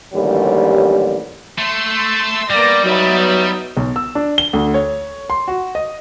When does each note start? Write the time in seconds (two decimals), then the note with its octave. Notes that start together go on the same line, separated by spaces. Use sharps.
0.13 A1 D#2 D3 F#3 G3
1.58 A3 C6 E6
2.50 G3 A#3 B3 D5 A#6
2.85 F#3 B3 D#4 E5 B5
3.77 B1
3.96 E6
4.15 D4
4.38 G7
4.53 D2
4.74 C#5
5.30 C6
5.48 F#4
5.75 D#5